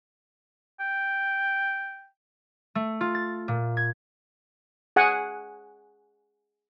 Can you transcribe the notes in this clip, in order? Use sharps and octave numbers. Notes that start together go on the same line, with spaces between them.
G5
A3
F4
A6
A#2
G#6
G#4 F#5 G#5